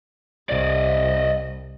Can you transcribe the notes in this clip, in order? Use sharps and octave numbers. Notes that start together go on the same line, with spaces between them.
C2 D5 D#5